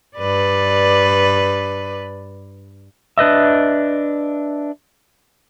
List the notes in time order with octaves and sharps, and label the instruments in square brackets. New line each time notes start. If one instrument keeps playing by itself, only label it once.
[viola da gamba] G2 B4 D5
[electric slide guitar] D4 B4 D#5 E5